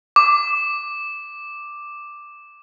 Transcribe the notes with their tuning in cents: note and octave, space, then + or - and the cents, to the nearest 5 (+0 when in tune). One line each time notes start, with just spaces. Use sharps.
D6 +5